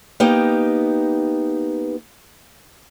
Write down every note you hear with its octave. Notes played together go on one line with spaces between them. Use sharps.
A#3 B3 D#4 G4